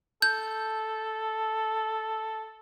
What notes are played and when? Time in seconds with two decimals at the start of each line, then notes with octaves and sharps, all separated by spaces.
0.22 A4 G6